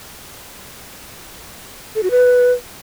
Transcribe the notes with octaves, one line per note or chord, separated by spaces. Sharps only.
A4
F#4
B4